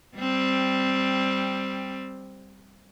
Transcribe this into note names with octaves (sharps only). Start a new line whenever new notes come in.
G3 C4